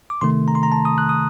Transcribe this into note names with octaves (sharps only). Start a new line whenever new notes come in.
D6
C3 D#3 A3 C6
A#5
C6
A#5
A5
D#6
F#6
D#6